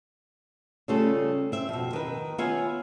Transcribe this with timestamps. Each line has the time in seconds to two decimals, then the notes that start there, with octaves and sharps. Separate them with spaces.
0.88 C#3 G3 A3 C#4 F4 A4
1.52 C4 E5
1.69 F2 B2
1.93 D#3 B4
2.38 B3 F4 C#5 E5 F5 G#5